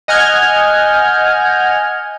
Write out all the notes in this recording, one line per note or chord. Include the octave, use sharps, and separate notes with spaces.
D#5 F#5 G#5 F6 G6 G#6